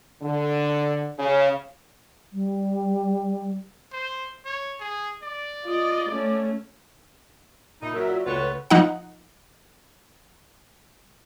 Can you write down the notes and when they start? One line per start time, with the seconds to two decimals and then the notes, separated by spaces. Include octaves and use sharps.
0.22 D3
1.19 C#3
2.33 G3
3.92 C5
4.45 C#5
4.80 G#4
5.23 D5
5.64 F4 D#5
6.10 A3 C#4
7.82 A#2 D#4 E4
7.94 F#3 A#4 E5
8.08 F4 F#4 D5
8.26 C#2 A3 F4 F#4 B4 C#5 G7
8.70 F3 D#4 F#5